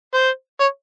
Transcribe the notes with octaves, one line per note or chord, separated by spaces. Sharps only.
C5
C#5